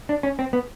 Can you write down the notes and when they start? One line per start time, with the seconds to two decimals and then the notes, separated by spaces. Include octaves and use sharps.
0.09 D4
0.23 C#4
0.39 C4
0.53 B3